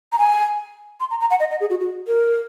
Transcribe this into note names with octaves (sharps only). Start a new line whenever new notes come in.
A#5
G#5
C6
A#5
A#5
F#5
D#5
D#5
G#4
F#4
F#4
A#4